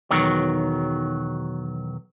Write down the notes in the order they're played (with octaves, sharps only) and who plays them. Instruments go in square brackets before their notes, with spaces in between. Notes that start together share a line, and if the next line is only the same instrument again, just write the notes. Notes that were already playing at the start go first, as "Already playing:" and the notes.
[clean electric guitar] B1 E2 D#3 F#3